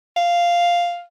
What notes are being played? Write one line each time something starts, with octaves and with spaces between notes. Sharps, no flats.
F5